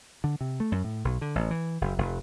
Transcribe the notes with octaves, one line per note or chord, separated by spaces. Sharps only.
D3
C3
A3
F#2
A2
B1
D3
A1
E3
F#1
F1